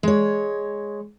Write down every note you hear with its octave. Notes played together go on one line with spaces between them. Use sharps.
G#3 C#5